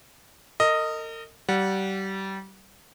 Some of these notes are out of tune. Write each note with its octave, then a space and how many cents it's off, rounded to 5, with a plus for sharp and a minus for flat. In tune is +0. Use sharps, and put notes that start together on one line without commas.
A#4 -40 D#5 +0
G3 -25 F#5 -15